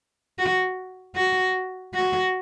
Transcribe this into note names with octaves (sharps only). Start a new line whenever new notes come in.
F#4
F#4
F#4